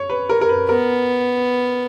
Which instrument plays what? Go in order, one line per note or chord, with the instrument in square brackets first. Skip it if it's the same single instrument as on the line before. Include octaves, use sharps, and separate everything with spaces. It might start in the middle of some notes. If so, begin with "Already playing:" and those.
Already playing: [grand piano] C#5
B4
A#4
A#4
B4
[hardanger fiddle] B3 [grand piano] A#4